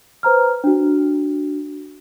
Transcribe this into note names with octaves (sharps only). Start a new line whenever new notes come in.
B4 C5 A#5 F6
D4 F#4